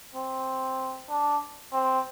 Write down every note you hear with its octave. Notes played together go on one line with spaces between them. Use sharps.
C4
D4
C4